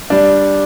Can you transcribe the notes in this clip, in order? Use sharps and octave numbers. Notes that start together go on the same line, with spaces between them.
G3 D4